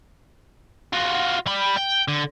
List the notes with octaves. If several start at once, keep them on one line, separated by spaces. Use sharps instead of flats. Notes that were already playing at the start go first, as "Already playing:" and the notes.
F4 F#4
G3 B5
G5
D3